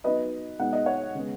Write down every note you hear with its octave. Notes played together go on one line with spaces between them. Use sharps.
F#3 B3 D#4 B4 D#5
B2 G#3 B3 D#4 F#5
D#5
C#5 F#5
C#3 G#3 B3